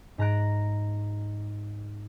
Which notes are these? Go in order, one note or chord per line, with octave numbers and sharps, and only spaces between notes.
G#2 A#5 F#6 D7